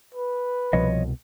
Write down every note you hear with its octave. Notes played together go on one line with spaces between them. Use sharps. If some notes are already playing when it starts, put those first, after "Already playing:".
B4
C2 B2 F3 C#5 D#5